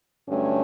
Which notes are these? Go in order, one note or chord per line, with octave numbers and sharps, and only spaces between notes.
G2 D3 F#3 A3 C#4